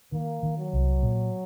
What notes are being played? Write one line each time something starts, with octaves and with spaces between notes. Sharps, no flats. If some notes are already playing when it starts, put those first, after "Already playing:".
D#3 A#3
D#3
F#3
C2
A#2